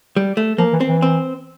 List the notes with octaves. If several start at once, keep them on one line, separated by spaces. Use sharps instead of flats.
G3
A3
F3 A#3
E3
C4
E3
C4